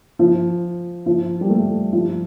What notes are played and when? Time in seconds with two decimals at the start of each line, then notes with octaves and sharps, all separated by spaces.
0.19 F3
1.06 F3
1.41 G3
1.49 A3
1.93 F3